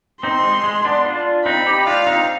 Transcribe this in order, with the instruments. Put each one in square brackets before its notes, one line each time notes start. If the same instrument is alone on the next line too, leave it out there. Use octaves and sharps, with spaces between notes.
[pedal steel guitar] C4 D#4 [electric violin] C6
[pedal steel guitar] G#3
G#3
B3 D4
D4 F4
[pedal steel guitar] C4 D#4 [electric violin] B5
[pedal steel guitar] D#4 G4
[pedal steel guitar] D4 F4 [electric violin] F5
[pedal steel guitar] C4 D#4